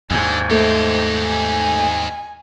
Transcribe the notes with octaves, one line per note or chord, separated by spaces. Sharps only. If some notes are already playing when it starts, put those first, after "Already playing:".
D#2 G#2 D3 G#5
A3 D#4 G4 C5
G#5